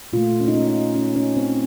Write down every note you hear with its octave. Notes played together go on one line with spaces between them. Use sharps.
A#2 A3 F4
C#4
D#4
C#4
D#4
C#4
C#4
C4